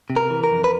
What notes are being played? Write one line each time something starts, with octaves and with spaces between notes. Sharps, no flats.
C3
A#4
E3
A#4
F2
B4